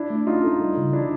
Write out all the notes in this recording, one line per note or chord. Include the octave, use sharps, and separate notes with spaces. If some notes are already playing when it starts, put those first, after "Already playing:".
Already playing: D4 E4
A3
C#4 D#4 F4
A4
G3
C#3
E3 D4 E4